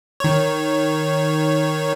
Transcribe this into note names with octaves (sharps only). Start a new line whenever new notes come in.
D#3 C#5